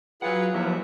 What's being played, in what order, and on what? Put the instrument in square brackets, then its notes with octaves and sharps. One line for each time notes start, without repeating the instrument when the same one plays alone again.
[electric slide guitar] F#3 F#5 [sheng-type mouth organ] F4 G#4 B4
[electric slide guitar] F3 E4 G4 [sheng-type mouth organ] E5